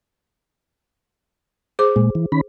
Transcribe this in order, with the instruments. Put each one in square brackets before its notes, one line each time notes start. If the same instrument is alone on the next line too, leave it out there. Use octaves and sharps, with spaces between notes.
[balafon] G#4 C5 D6
[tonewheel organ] A#2 G#3
E3
D#3 C#4 B5